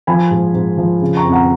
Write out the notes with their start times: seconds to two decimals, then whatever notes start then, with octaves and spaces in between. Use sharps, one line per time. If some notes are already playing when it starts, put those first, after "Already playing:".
0.07 F3 G#5 B5
0.31 G#2
0.54 G#2
0.77 F3
1.02 C#3
1.17 A#5 C#6
1.25 F2
1.32 F#5 A#5